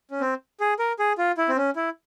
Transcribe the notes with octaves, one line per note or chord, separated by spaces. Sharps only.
C#4
C4
G#4
A#4
G#4
F4
E4
C4
C#4
E4